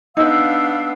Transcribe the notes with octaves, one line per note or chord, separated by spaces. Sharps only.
B3 D4 D#4 F5 E6